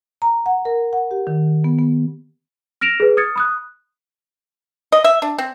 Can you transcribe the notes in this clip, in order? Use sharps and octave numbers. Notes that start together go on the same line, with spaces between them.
A#5
F#5
A#4
F#5
G4
D#3
B3
B3
F6 A#6 D7 E7 F7
G#4 B4
D#6 F6 G#6 A6 C#7
B5 D#6 F#6
D#5
E5
D4
C4